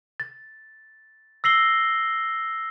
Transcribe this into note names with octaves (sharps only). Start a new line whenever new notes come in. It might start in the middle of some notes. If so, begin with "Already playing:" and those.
A6
E6 A#6 C7 F#7 G7